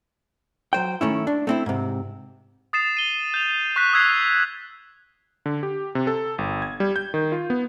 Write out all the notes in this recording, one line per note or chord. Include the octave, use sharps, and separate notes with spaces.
F#3 C5 G5
D#3 A3 C#4 E4
D4
A3 C4 E4
G#2 C3
D#6 A6 C7 E7
D#7 G7
G6 F7
C#6 F#6 B6
D#6 E6 F#6 G#6 B6 C7
D3
G4
C3
A4
G1
G#6
G3
G6
D#3
F4
B3